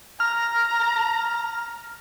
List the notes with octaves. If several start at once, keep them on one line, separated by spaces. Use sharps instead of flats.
A#5 F6